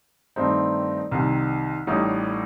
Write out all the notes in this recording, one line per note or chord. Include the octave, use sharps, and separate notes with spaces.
G2 D#3 A3 C4 D#4
C2 C3 D#3
A1 A2 G3 D#4